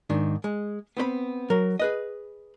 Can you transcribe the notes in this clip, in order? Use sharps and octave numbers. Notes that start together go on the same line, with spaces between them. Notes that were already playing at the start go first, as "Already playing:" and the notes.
G#2 D#3 D4
G#3
B3 C4 C5 B5
F#3 A#4
G#4 B4 D#5